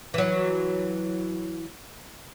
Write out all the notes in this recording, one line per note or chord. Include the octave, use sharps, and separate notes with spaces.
E3 F#3